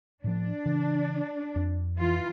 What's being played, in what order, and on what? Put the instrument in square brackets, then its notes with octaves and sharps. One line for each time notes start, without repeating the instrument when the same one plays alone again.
[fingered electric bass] A2 F3 [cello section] D4
[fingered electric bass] C#3 E3
F2
[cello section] E3 F4